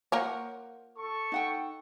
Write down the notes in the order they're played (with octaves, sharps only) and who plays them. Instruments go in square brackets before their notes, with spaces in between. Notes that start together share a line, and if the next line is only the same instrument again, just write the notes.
[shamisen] A#3 A#4 C#5 [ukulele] F4 C5 F#5
[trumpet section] A4 C#6
[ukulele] D#4 F#5 G5